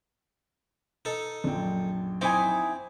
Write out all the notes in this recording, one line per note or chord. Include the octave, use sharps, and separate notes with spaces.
D#4 A4
A#1 F#2 G5
C4 D#4 E4 G#5 D6